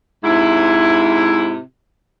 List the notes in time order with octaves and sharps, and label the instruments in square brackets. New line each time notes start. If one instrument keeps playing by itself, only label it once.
[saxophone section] G#2 C3 E4